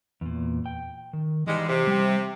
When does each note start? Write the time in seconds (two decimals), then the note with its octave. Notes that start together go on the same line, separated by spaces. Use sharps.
0.21 E2 A#2
0.66 G5
1.13 D#3
1.47 G#2 E3 G3 G#3
1.68 C3
1.87 G3 C5 G5